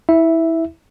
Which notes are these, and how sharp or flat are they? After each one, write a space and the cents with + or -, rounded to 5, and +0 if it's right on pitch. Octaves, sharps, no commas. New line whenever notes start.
E4 -20 E5 +0